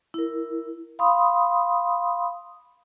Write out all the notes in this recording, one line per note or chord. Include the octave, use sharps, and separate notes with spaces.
E4 A#4
F5 B5 C6 D#6